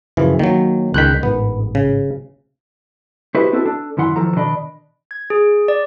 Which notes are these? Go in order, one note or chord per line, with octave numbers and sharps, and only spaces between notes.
F#2 C#3 E3 F3
D#3 F#3 A#3
C#2 D#3 F#6 G6 B6
A1 G#2 B3
C#3
E4 F#4 G4 B4 C5 D#5
B3 C4 E4 F#4 A4
D4 A4
F#2 D#3 E4 F#5 C6
E2 D#3 F3 A4 A#5
B2 D#3 D4 D5 D#5 B5
G#6
G#4
D5